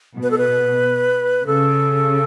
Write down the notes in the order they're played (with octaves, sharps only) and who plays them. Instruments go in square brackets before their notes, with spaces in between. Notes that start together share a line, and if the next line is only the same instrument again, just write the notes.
[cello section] B2
[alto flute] B4
A4
B4
[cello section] C#3 [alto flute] A4